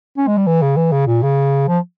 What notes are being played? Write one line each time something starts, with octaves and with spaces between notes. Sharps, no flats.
C#4
G#3
G3
E3
C#3
E3
C#3
A#2
C#3
F3